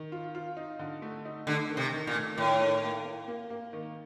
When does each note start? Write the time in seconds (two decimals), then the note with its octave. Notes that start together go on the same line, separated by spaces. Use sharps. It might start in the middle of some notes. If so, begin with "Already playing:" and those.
Already playing: D#3
0.12 F4
0.35 F4
0.57 D#4
0.79 D3
1.02 A3
1.25 D#4
1.47 D3 A3
1.70 D#3
1.77 C3
1.93 D#3
2.07 A#2
2.15 A3
2.37 A2 D#3
2.60 D#3
2.83 A#3
3.05 A#3
3.28 A#3
3.50 A#3
3.73 D#3